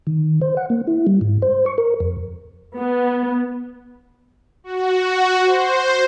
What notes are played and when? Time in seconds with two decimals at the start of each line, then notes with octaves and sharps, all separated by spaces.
0.07 D#3
0.41 C5
0.57 F#5
0.70 A#3
0.87 E4
1.07 G3
1.21 G#2
1.42 C5
1.66 C#6
1.78 A#4
2.00 F2
2.78 B3
4.64 F#4
5.45 C5